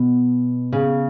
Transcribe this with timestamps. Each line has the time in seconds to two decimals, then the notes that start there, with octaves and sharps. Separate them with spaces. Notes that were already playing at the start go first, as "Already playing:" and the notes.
Already playing: B2
0.73 C#3